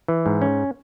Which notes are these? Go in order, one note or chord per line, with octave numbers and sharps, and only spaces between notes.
E3
G#2
C#4